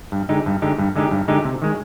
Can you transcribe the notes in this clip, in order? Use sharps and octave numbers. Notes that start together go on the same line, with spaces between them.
G2
D3 G#3 D#4 G4
G2
D3 G#3 D#4 G4
G2
D3 G#3 D#4 G4
G2
D3 G#3 D#4 G4
C3
D#3 G#3